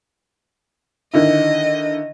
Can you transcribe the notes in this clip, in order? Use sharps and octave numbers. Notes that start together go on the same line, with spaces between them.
D3 D#3 E4 D#5